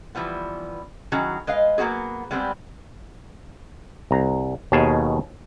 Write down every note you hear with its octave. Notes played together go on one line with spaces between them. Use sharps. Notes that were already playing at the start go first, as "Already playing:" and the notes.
E3 F3 G3 B3
D#3 F#3 C#4 E4 F#4 G#4
G#3 B4 D#5 F5
F#3 A#3 B3 F#4 G#4
G3 G#3 B3 C4 G4 B4
C2 A#5
D#2 B2 G#4 F5 G#5 A5